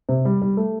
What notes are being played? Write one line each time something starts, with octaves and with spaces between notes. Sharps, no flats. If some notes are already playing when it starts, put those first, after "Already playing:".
C3
G3
G3
A3